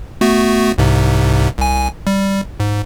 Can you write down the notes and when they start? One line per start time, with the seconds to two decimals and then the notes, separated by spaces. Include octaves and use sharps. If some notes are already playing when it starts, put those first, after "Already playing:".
0.21 A3 B3 F#4
0.78 C2 G#2 C3
1.58 C2 G#5
2.07 G3
2.60 G#2